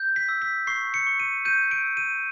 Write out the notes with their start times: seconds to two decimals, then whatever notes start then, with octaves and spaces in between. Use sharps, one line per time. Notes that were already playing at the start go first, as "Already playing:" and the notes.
Already playing: G6
0.16 B6
0.29 E6
0.42 B6
0.67 C#6 C7
0.94 C#7
1.07 C#6
1.20 D#7
1.45 G6 D#7
1.71 D7
1.84 E6
1.97 D#7